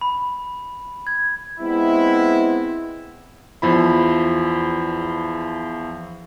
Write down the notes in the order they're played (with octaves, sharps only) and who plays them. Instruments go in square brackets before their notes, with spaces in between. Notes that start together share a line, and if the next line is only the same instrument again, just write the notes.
[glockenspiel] B5
G#6
[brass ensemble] G#3 B3 C4 E4
[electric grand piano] E2 F3 E4 B5